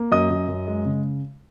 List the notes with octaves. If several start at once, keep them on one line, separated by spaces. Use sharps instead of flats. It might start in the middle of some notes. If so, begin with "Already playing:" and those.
Already playing: A#3
F#2 D#5 D#6
F#2
F#2
G#3
C#3